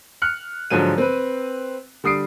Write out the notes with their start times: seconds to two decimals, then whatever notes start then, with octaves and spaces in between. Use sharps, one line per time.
0.22 F6 F#6 C#7
0.70 G#2 D3 F3 F#3 D#7
0.98 C4 B4
2.04 D3 G3 D#6 C7 D7